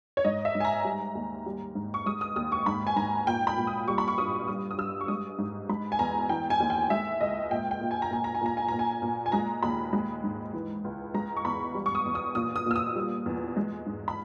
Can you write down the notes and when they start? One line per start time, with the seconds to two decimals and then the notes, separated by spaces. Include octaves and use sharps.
0.17 C#5
0.25 G#2 D#5
0.45 E5
0.55 G#2
0.60 G#5
0.65 A#5
0.85 G3
1.15 D#2
1.46 G3
1.75 G#2
1.94 C#6
2.06 G#3 D#6
2.21 D#6
2.36 D#2 D#6
2.52 C#6
2.66 G#2 B5
2.87 G#5
2.96 G#2 A#5
3.27 A#2 G5
3.47 B5
3.57 A#2
3.67 D#6
3.88 G3 C#6
3.98 B5
4.08 C#6
4.18 G2 D#6
4.48 G3 D#6
4.71 D#6
4.78 G2 E6
5.01 C#6
5.08 G#3 D#6
5.39 G#2
5.69 G#3 B5
5.92 G#5
5.99 E2 A#5
6.29 E3 G5
6.50 G#5
6.60 D#2
6.70 G5
6.90 G#3 E5
7.21 C#2 D#5
7.51 A#2 G5
7.71 G5
7.81 A#2
7.91 G#5
8.02 A#5
8.11 A#2 G#5
8.24 A#5
8.35 G#5
8.41 A#2 A#5
8.57 G#5
8.68 A#2 A#5
8.79 G#5
9.02 A#2
9.26 G#5
9.32 G#3 A#5
9.63 D#2 B5
9.93 G#3
10.24 G#2
10.53 E3
10.84 C#2
11.14 G#3 A#5
11.37 C#6
11.45 E2 B5
11.75 G3
11.86 C#6
11.95 D#6
12.05 E2
12.15 D#6
12.35 A#2 D#6
12.56 D#6
12.66 A#2 E6
12.76 D#6
12.96 G3
13.26 E2
13.57 G#3
13.86 G#2
14.08 B5